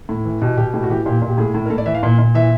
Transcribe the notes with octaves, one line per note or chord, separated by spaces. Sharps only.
A2
E3
B2 G4
B2 G4
A2 G4
F#4
E3 G4
A#2 G4
A#2
G4
A2 G#4
A2
A#4
A2 A4
D5
E3 E5
F5
A#2
A#2
E3 E5